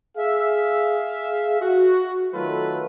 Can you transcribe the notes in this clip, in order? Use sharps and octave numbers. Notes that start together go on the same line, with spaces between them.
G#4 E5 F5
F#4
D#3 F#3 A3 F4 A4 B4